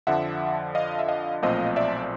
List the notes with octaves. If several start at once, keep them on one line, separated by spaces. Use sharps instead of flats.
F2 D3 F3 E5 F#5
D#5 F5
E5
D#5 F5
B1 A#2 F3 A3 C4 D#5 F5
D5 E5